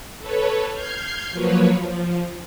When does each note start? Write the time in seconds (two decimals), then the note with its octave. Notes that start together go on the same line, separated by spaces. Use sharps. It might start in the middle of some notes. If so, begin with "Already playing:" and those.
0.19 A4 B4 C#5
0.71 F6 G6 G#6 C7
1.32 F3 F#3 A#3 B4 C#5
1.78 F3